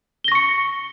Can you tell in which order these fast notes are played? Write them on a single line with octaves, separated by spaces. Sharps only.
G7 A#6 C#6 C#7